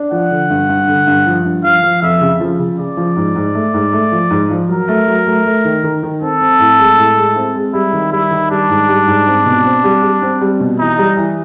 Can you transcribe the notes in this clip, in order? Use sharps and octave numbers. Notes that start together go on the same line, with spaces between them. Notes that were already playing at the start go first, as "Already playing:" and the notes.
Already playing: D4
F3 F#5
D3
G2
G2
D3
G2
F3
G2
F3 F5
F3
F2 E5
C#3
F3
C#3
C#3 D5
F3
G#2
G#2
A3
G#2
A3
F3
G#2
F3
F#3 A#4
A3
F#3
A3
A3
D#3
D#3
D#3
C4 A4
C4
A2
G#3
A2
G#3
C4
G#3
G3 E4
D#3
G3 E4
D#3
G3 D4
G#2
G3
G#2
C4
B2
C4
G3
G3
C4
G3
B2
E3 D#4
G3
E3